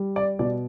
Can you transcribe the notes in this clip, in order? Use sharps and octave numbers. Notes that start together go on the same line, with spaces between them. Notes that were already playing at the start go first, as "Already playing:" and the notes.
Already playing: G3
D5
B2 D5